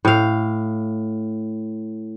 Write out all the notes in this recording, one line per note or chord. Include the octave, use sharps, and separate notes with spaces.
A2 F5